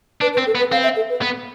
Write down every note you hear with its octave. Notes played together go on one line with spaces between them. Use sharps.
D4 B4
B4
C4
A4
B3
B4
C4 F5
E5
A4
B4
B3